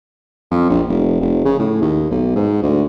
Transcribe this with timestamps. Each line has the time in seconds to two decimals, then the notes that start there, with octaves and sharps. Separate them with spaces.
0.51 F2
0.70 A#1
0.89 F1
1.21 F1
1.45 C#3
1.59 A2
1.81 D#2
2.11 B1
2.36 G#2
2.62 D2